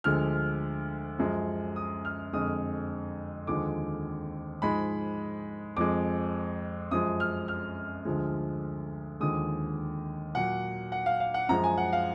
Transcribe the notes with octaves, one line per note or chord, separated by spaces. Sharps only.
D2 D3 F3 G#3 F6
F#2 F3 G#3
D#6
F6
F2 D3 G#3 D#6
D#2 D3 F3 G#3 D6
G#2 F3 G#3 B5
F2 F3 G#3 D6
F#2 F3 G#3 D#6
F6
F6
D2 D3 F3 G#3
D#2 D3 F3 G#3 D#6
A#2 F#3 F#5
F#5
F5
F5
F#5
F#2 F3 G#3 A#5
G#5
F#5
F5